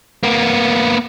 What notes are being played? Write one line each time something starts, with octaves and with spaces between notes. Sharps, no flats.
A#3 B3